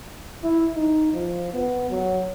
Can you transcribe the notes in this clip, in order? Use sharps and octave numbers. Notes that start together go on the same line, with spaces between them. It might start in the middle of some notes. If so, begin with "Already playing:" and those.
E4
D#4
F3
B3
F#3